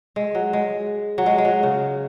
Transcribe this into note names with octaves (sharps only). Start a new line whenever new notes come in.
G#3
F#3
G#3
F#3
G#3
G#3
F#3
C#3